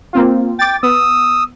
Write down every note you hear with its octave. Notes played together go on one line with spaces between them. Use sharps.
A#3 C4 F4
G5 D6 A6
B3 D#6 E6